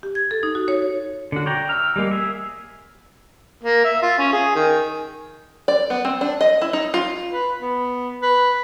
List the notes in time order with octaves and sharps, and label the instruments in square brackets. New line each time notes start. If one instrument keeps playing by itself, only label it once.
[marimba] G4
G#6
A4
D#4
F#4
C#5
[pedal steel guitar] D3 F#4
C#5 D5 G5 A#5
E5 A#5 F6
G3 G#3 A#3
G#4 E5
[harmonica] A#3
E5
F4
C#4
G#4
D#3
[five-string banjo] D5
B3
C4
D4
D#5
E4
D#4
F4
[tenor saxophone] B4
B3
B4